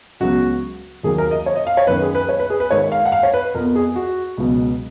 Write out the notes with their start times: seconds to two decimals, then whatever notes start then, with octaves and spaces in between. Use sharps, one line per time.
0.20 C#2 C#3 F#3 B3 F#4
1.03 D#2 D#3 F#3 A#3 G#4
1.18 A#4
1.31 D#5
1.46 C#5
1.56 D#5
1.67 F5
1.77 C#5
1.87 F#2 D#3 A#3 B4
2.02 G#4
2.15 B4
2.29 C#5
2.40 B4
2.50 G#4
2.60 B4
2.71 G#2 D#3 A#3 C#5
2.92 F5
3.06 F#5
3.12 F5
3.23 C#5
3.34 B4
3.55 F2 F3 B3 A#4
3.75 G#4
3.96 F#4
4.37 C#2 B2 F#3